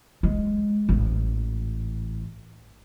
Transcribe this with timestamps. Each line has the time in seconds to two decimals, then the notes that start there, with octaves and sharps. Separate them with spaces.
0.23 G#3
0.89 A1 G#2